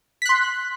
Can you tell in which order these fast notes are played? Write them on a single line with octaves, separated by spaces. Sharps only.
B6 F#6 C6